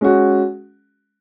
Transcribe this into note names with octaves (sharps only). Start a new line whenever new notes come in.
G#3 C#4 F#4